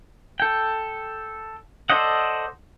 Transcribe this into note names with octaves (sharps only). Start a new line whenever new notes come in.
A4 G5
A4 C5 D5 D#5 F#5